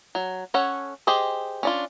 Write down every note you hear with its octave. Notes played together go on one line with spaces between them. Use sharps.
F#3
C#4 A4 C#5 F#5
G4 G#4 C5 D#5
C#4 D4 F4